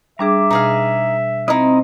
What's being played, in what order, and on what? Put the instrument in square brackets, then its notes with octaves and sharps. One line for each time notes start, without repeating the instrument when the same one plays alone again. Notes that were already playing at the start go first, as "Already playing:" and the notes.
[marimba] G3 D4 G#4 [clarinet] E5 [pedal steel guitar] A#5 D6
[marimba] B2 [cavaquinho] D#4 G#4 F5
[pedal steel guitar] C4 D#5 [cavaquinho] D#4 E4